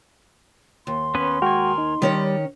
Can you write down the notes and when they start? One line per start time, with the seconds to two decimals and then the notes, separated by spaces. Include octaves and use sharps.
0.87 D#2 C6
1.15 B3 C#4 B4
1.42 G#3 F#4 A#4 G5 G#5
1.78 D#4
2.02 D#3 G3 C#4 C#5